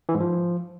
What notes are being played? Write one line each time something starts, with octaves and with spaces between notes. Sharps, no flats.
E3
G#2
F3